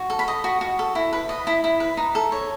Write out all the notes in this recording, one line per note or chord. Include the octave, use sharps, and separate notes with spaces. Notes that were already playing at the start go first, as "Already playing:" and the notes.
Already playing: F#4
A4
B5
D#5
F#4
F#4
A4
E4
B4
D#5
E4 B5
E4
B4
D#4
A4
C#5